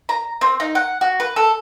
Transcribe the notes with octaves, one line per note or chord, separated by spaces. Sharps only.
A#5
C4
D#4
F#5
F#4
B4
A4